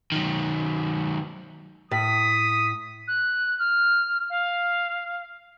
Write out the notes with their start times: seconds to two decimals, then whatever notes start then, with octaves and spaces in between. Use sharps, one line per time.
0.12 D#3 F#3
1.91 A2 D#6 B6
3.08 F#6
3.59 F6
4.30 F5